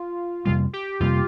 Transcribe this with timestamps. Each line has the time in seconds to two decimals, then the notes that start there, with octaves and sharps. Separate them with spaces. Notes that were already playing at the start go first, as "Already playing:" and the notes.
Already playing: F4
0.45 F2 C3 G3 A#3 F4
0.73 G4
1.00 F2 C3 G3 A#3 F4